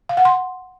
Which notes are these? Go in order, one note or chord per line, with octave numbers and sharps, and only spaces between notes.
F5
F#5
C6